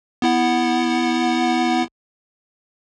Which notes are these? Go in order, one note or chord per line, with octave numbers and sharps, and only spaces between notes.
B3 E4 F#5